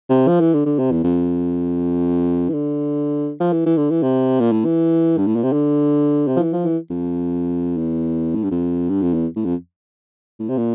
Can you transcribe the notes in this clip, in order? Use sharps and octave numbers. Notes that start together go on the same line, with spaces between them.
C3
F3
E3
D3
D3
C3
E2
F2
E3
D3
F3
E3
E3
D3
E3
C3
A#2
A2
E3
G2
A2
A#2
C3
D3
C3
F3
E3
F3
E3
F2
E2
A2
G2
F2
G2
F2
E2
A2
F2
A2
C3
A#2